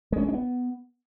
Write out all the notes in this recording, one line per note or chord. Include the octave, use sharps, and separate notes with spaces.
G#3
C#4
G#3
D4
B3